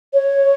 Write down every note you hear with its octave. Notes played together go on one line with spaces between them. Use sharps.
C#5